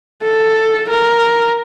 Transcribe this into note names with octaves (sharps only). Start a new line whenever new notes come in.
A4
A#4